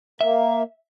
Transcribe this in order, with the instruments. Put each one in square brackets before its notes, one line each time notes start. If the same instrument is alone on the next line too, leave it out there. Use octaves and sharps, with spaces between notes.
[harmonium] A#3 [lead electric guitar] E5